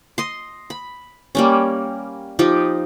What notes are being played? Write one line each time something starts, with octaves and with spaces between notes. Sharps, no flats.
D#5 C6
B5
G3 A#3 C#4
F3 D#4 G4